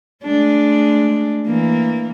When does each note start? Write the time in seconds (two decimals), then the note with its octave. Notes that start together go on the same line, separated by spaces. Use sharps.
0.24 G#3 A3 D4
1.46 E3 A#3